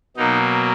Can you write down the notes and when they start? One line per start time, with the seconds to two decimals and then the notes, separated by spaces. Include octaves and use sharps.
0.17 B2 F#3 A#3 D#4